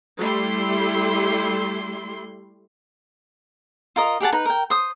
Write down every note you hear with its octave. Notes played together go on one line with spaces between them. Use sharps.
G3 A3 E4 C6
F4 A#4 D#5
G4 G#4 F#5 A5
D#4 B4
A#4 G5
C5 D#6